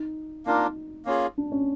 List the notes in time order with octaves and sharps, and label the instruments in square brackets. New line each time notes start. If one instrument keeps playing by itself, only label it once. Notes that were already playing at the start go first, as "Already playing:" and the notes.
Already playing: [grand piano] D#4
[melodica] A#3 D4 F4 A#4 [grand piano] D#4
[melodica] A#3 C#4 F4 G#4
[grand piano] D4
C#4